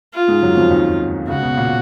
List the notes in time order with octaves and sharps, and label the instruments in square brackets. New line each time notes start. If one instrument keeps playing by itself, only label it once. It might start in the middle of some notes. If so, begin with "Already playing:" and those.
[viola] F4
[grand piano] G#2 G#3
F#2 F#3
F2 F3
D#2 D#3
[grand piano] C#2 C#3 [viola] F#4
[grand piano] B2
A#2